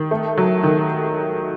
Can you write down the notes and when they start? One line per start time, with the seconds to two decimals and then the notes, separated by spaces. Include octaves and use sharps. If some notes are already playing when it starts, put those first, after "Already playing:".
Already playing: D#3
0.11 A3
0.37 F#3
0.63 D#3